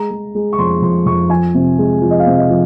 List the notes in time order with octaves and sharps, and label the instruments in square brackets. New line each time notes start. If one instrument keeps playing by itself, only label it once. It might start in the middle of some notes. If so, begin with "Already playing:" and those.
Already playing: [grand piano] G#3 A#5
G#3
G#3
C#6
F2 C6
F2 C6
F2 C#6
F3 G#5
C3
G#3
F3
D#5
F5
C3
D#5
F3